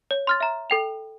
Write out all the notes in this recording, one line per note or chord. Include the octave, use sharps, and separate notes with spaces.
C#5
C6 F6 A6
E5 A#5
A4 G5 F7